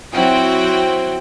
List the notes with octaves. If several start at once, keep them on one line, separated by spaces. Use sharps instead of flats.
F#3 C4 E4 F#4 G5